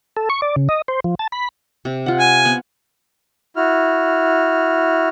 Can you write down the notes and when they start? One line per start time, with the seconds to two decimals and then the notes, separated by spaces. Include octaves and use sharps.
0.17 A4
0.30 C#6
0.42 D5
0.56 C#3
0.69 D#5
0.88 C5
1.04 F3
1.19 A5
1.32 B5
1.85 C3
2.06 F4 F#5
2.20 G#5
2.45 B3
3.56 E4 F#4 F6